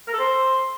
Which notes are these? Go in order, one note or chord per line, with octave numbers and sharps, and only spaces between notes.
A#4
A4
C5